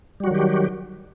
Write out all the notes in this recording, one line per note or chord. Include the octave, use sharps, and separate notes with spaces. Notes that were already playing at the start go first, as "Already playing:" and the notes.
D#3 F#3 G3 F#4 G4